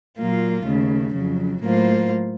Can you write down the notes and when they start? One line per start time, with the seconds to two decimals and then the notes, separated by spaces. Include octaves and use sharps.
0.17 A#2 F#3 A#3 F4
0.65 D#2 C#3 A3
1.13 F2 C#3 F#3
1.62 A2 F#3 A#3 F4 C5